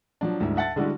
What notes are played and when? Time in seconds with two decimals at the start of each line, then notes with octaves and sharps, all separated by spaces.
0.21 F3 F#3 D4
0.40 D2 G#2 G3 D4 E4
0.57 E5 F#5 A5 A6
0.76 D3 G3 G#3 D4 E4 F#4